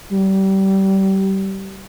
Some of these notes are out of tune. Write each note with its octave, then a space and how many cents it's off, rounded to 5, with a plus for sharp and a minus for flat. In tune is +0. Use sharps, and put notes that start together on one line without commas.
G3 -25